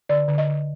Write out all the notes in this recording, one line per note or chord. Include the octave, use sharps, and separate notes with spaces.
D3 D5
D3
D#5
D3